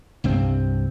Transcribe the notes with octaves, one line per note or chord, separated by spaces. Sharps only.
C2 G2 C4